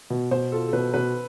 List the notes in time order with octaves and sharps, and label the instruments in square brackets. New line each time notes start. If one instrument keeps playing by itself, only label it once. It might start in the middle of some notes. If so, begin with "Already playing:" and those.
[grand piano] B2
[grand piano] B2 [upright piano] C5
[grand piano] F4 [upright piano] A4
[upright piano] A4
[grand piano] B2 [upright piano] B4
[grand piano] B2 [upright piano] B4